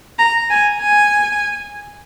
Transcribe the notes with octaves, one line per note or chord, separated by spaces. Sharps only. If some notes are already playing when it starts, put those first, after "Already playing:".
A#5
G#5
G#5